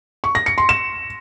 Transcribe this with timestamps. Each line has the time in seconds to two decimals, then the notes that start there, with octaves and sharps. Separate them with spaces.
0.24 C#6
0.35 A#6
0.46 C#7
0.58 C6
0.69 E7